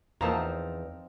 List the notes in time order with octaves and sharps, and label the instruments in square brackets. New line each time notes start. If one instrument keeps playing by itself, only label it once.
[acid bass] E2 [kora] F3 C4 D#4 [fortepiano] A#4 A5 A#5